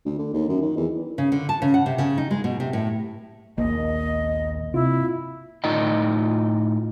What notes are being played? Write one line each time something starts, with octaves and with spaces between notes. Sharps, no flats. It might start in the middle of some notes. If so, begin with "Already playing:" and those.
D2
D3
D#2
F#2
D#3
E2
C#3
D3
A5
C#3
F#5
C3
C#3
D#4
G#3
B2
C3
A2
A#1 D#2 A#3 D#5
C3 C4 E4 F4
A2 D#4 F4 D#5 G5